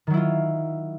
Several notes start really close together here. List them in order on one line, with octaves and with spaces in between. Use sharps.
D#3 F#3 E4 F4